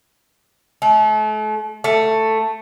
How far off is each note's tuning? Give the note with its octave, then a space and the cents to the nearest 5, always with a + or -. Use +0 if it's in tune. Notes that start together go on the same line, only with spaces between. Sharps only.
A3 -40
A3 +5